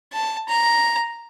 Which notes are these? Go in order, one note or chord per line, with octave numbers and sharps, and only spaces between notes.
A5
A#5